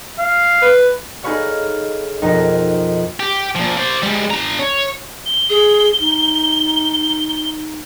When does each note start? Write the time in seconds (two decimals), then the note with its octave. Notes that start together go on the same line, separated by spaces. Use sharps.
0.19 F5
0.62 B4
1.23 D#4 G#4 A4 B4 C#5 F5
2.22 F2 B2 D#4 A#4
3.20 G4
3.55 A#2 F3
3.77 C5 D5
4.02 G3 G#3
4.31 D4 A#5
4.60 C#5
5.25 G7
5.50 G#4
5.99 D#4